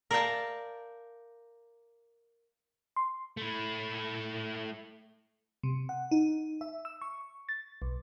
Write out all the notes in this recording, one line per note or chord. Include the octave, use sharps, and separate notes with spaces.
A#4 D5 E5 F5 G5 A5
C6
A3 E4
C3
F#5
D#4
E5
E6
C#6
A6
B1